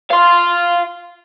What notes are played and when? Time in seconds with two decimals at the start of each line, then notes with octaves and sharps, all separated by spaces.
0.11 F5 C6